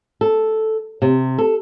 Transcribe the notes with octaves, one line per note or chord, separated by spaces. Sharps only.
A4
C3
A4